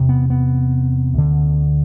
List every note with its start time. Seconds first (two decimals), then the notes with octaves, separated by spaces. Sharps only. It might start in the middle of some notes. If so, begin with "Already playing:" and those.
Already playing: E2 C3
0.09 B3
0.30 B3
1.14 D2 D3